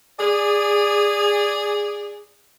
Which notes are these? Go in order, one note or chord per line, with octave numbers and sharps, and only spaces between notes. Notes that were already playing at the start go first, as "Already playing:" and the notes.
G#4 D5